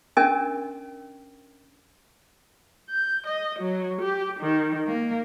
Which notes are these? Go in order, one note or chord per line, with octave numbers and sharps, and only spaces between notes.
C#4 D4 A#4 D#5 G#5
G6
D#5
F#3
G4
D#3
A#3